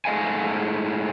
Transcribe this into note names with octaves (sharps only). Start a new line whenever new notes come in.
G#2 A3 D#5 F5 G#5